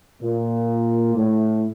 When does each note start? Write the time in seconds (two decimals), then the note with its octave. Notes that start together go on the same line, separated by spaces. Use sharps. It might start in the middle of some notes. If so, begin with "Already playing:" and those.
0.22 A#2
1.15 A2